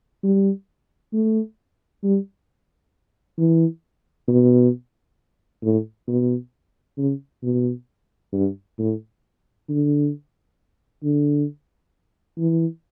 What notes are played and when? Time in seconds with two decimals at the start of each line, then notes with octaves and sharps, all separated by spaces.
0.23 G3
1.13 A3
2.03 G3
3.38 E3
4.28 B2
5.63 A2
6.08 B2
6.98 C#3
7.43 B2
8.33 G2
8.78 A2
9.69 D3
11.03 D3
12.38 E3